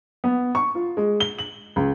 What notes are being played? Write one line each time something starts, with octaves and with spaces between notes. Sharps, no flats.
B3
C#6
F4
G#3
G7
F#7
C#2